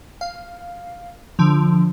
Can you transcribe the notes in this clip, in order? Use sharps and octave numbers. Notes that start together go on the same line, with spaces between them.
F5
D3 F3